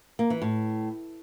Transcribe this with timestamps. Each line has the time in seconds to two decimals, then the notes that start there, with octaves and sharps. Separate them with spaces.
0.19 A#3
0.30 E3
0.42 A2